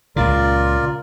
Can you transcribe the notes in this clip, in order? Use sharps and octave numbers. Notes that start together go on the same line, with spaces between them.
C#2 A#2 C#3 F4 A#4 D5